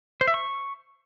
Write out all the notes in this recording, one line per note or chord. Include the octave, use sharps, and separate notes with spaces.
C5
E5
C#6